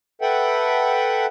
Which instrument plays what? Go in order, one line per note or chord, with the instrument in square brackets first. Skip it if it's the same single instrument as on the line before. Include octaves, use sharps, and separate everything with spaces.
[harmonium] A4 B4 E5 F#5 G5